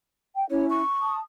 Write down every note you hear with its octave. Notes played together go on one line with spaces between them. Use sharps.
G5
C#4 E4 C#5
C#6
A5 D#6